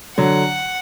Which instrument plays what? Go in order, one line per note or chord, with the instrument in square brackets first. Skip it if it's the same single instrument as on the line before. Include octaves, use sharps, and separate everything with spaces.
[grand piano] D3 F#3 [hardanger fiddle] F#5